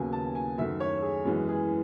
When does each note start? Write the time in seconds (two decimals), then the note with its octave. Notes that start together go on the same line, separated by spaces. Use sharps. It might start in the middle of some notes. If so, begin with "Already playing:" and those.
Already playing: D#2 C#3 F#3 B3 G#5
0.13 A5
0.35 G#5
0.58 F#2 D#3 A3 E5
0.80 C#5
1.02 G#4
1.25 F#2 E3 G#3 B3
1.48 G#4